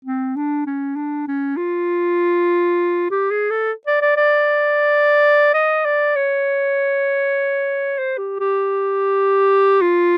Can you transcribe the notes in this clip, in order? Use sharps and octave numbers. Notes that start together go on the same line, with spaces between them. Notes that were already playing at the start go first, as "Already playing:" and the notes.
C4
D4
C#4
D4
C#4
F4
G4
G#4
A4
D5
D5
D5
D#5
D5
C#5
C5
G4
G4
F4